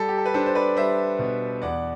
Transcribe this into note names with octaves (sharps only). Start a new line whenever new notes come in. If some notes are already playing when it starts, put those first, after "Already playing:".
Already playing: G3 A4
G4
A4
B4
D4 A4 C5
C5
B4 D5
G3 C5 E5
B2
E2 D5 F#5